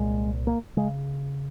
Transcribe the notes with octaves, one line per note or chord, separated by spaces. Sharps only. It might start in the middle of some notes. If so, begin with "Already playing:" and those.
Already playing: C2 A#2 G#3
A#3
C#3 G#3